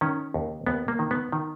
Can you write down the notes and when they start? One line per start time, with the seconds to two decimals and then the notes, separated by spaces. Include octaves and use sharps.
0.01 D#3 C#4
0.34 D#2
0.66 D#2 B3
0.88 A#3
0.99 D#3
1.11 B3
1.32 D#3